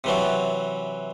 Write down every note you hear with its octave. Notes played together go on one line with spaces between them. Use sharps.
C3 E3 F#3